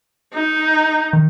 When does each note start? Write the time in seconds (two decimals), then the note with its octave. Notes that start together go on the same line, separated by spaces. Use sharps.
0.34 D#4
1.13 D#3